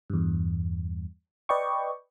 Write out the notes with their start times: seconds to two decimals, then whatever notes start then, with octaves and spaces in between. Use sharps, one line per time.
0.10 E2 G2
1.49 B4 D5 D#5 G5 C#6